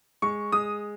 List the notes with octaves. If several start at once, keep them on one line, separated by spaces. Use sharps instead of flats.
G#3 C#6
G#3 D#6